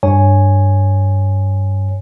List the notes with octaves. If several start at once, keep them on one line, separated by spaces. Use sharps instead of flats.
G2 C#5 G#5